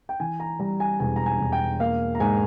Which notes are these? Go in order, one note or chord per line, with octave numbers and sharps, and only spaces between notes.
G5
E3 G#5
A#5
G3 A#5
G#5
E1 G#5
A#5
G#5
E1
G5
A#3 F5
A#5
G#2 G#5